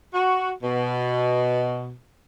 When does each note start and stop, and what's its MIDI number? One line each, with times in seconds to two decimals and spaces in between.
0.14 0.50 66
0.63 1.92 47